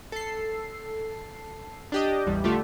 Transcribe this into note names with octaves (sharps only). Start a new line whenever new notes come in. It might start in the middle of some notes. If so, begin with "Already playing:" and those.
A4 C7
D4 G4 D#5
A1 E2 G3
D3 A3 F4 G4